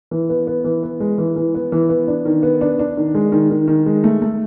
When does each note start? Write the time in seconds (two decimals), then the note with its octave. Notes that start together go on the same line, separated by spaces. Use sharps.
0.11 E3
0.29 B3
0.47 B3
0.64 E3
0.83 B3
1.00 G#3
1.18 E3
1.36 E3
1.55 B3
1.72 E3
1.89 B3
2.08 D4
2.25 D#3
2.43 B3
2.61 D4
2.79 D4
2.97 D#3
3.15 G#3
3.32 D#3
3.50 D#3
3.68 D#3
3.86 G#3
4.04 A3
4.22 A3